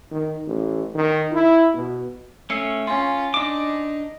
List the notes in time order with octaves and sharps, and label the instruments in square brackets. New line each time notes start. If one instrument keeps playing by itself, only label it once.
[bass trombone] D#3
A1
D#3
E4
B2
[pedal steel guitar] A3 C#4 [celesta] E6 C7 C#7
[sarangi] C#4 [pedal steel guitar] F4 [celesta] G#5 C6
[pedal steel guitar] D4 D6 [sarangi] D#4